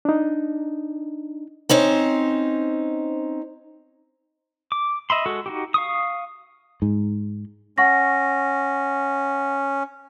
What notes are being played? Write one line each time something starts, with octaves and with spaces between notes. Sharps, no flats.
D4 D#4
C4 C#4 D#4 C5
D6
D#5 E5 B5 C6
G#3 F#4 A4
D#4 F#4 G4
F5 C#6 D#6
G#2
C#4 F#5 C#6 A#6